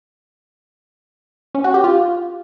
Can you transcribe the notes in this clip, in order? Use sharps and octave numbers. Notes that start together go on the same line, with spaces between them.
C#4
F#4
G4
F4